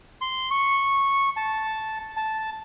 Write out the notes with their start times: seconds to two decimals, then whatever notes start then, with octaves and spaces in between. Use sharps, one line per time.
0.21 C6
0.51 C#6
1.37 A5
2.17 A5